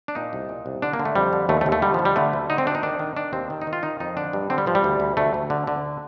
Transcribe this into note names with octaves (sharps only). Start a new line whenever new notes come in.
D4
A#2 D#4
C2
A#2
C2
D3 D4
A#3
D3
A3
F2 G3
D3
D#2 A3
A3
D#2
A3
D3 G3
D3 F3
G3
D3 A3
D2
D3 D#4
C4
D2 D4
D#4
D#3 D4
D#3
D#3 D4
D#2 C4
D#3
D#4
D#3
F4
D#3 D#4
F2 D#4
D3 D4
G2
D3 C4
G3
G2 F3
G3
D2
D2
D2 A3
D2
D3
D3